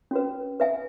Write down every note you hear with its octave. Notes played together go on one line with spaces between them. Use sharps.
C#4 F#4 B4
B4 E5 G#5